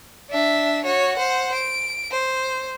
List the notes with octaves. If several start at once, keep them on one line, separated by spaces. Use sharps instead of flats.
D4 E5
F#4 C#5
C5 F#5
D7
C5